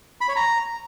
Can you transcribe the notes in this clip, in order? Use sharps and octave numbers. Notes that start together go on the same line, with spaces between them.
B5
C#5
A#5